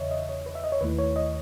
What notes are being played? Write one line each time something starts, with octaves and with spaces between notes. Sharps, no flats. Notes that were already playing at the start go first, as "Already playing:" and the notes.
Already playing: E2 C#3 E3 C#5 D#5 E5
D#5
C#5
B4
E5
D#5
C#5
D#2 D#3 A3 E4 B4
C#5
D#5